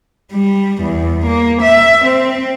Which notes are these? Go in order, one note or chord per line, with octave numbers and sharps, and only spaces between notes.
G3
E2
A#3
E5
C4